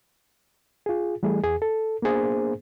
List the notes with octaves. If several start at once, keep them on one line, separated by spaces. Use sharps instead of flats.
F4 G#4
E3 G3 A3 G#4
E2 G#4
A4
A#3 B3 D4 G#4 C5